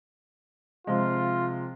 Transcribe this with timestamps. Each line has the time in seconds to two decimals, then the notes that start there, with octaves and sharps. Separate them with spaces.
0.87 C3 F3 G#3 F4